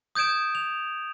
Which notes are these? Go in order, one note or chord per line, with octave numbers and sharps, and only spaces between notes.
D#6 G6 G#6 D7 E7
F7